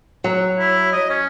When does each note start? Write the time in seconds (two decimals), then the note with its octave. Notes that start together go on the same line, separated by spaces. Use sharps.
0.24 F#3
0.58 E4
0.92 D#5
1.10 C#4